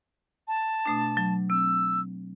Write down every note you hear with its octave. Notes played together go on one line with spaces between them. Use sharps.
A5
B2 A3 D4
F#3
C4 E6